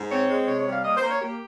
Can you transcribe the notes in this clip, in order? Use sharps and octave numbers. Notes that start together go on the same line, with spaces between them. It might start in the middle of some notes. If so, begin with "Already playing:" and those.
Already playing: G#2
C4 C#5
G#3
C3 C#5
C#5
G3
F5
A#3 D#5
C5
A#3
C#5
A#3 G4